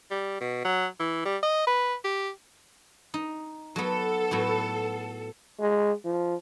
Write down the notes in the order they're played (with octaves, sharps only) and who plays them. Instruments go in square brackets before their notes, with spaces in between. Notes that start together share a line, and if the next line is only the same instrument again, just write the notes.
[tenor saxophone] G3
B2
F#3
E3
G3
D#5
B4
G4
[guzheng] D#4
[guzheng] F#3 B3 [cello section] A4
[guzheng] A2 F#3 B3
[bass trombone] G#3
F3